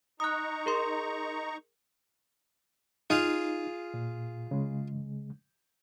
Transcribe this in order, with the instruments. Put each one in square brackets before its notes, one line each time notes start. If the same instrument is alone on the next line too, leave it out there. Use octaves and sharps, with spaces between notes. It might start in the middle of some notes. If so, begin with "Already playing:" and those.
[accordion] D#4 A#5 C#6 [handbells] D#6 F#6
[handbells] G#4 A#4 C6
[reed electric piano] D#4 [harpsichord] F4 G#4 F5
[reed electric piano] A#2
C#3 G#3